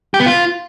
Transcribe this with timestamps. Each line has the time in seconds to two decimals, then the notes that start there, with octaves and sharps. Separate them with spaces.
0.14 G4
0.20 B3
0.26 F4